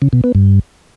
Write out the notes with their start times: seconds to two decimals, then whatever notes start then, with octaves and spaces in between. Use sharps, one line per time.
0.02 C#3
0.13 B2
0.24 B3
0.35 G2